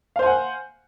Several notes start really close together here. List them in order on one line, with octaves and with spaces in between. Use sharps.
F5 C5 G#5 F#5